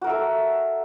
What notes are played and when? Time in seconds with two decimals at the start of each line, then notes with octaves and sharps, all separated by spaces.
0.01 F#4
0.04 A#4
0.07 E5
0.10 A4